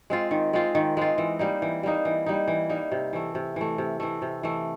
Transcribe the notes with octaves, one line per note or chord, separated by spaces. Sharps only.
G#3 C4 F4
D#3
G#3 C4 F4
D#3
G#3 C4 F4
E3
G3 A#3 D#4
E3
G3 A#3 D#4
E3
G3 A#3 D#4
E3
G3 A#3 D#4
C3
E3 A3
C3
E3 A3
C3
E3 A3
C3
E3 A3